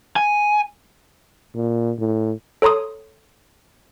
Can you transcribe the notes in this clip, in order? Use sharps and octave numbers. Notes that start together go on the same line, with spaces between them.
G#5
A#2
A2
A4 C#5 A#5 C6 D#6